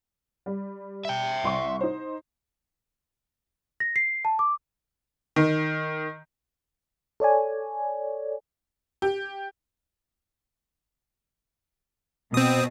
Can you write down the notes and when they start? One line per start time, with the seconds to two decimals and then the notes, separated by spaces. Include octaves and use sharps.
0.46 G3
1.05 E5 G5
1.43 C2 C6 C#6
1.81 D#4 C5
3.80 A#6
3.96 C7
4.25 A5
4.39 D6
5.36 D#3
7.20 A4 C#5 D5 G#5
9.02 G4
12.34 B2 C4 D#6